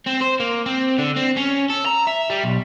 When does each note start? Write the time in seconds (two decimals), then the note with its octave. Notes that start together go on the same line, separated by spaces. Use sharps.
0.07 C4
0.21 C5
0.40 A#3
0.66 C4
0.98 D3
1.16 C4
1.37 C#4
1.70 A4
1.87 A#5
2.07 E5
2.30 G3
2.44 B1